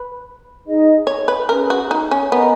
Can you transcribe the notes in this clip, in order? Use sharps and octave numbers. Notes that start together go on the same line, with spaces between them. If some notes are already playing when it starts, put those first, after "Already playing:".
Already playing: B4
D#4 G#4 D#5
C#5
B4
C#4 G#4 A#4 B4
F#4
D#4
C#4
B3 A#4 D#5 A#5